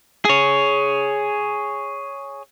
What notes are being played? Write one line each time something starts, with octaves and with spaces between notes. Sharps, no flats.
G#4 C#5